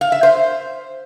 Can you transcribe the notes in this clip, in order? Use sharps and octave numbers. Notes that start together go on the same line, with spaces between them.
F5
E5
C5